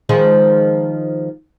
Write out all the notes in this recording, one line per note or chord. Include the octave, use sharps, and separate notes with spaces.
D#3 F3 G#3